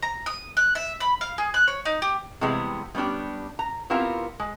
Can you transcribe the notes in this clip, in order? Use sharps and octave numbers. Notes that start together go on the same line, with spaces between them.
A#5
D#6
F#6
E5
B5
F5
G#4
F#6
C#5
D#4
G4
C3 E3 G3 G#3 B3
G3 B3 C#4 D4 G4
A#5
B3 C4 E4 F4 G4 A#4
G#3